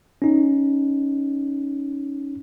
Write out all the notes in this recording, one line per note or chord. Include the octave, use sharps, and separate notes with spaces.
C#4 D#4